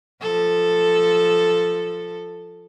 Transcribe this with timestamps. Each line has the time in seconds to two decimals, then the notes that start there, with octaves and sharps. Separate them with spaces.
0.21 F3 A4